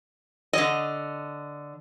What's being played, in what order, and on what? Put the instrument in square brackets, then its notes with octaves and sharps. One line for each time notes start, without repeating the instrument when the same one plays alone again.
[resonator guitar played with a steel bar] D3 D#5